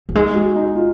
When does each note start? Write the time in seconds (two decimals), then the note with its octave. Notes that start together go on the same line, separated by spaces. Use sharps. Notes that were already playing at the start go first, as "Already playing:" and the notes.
0.09 F#3
0.15 G#3 D#4
0.35 F#4
0.56 D#4
0.75 F4